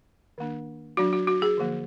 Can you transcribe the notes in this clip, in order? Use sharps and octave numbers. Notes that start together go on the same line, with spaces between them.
D#3 A#3 D4
F#3 D4 F#4
F#4
F#4
G#4
D3 F3 A#3